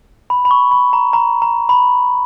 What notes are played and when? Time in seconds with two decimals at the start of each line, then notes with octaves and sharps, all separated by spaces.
0.30 B5
0.45 B5
0.51 C#6
0.71 B5
0.93 A#5
1.13 A#5
1.42 A#5
1.69 B5